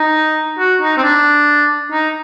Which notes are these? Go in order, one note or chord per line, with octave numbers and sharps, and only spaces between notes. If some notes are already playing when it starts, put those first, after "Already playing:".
Already playing: D#4
F#4
D#4
C4
D4
D#4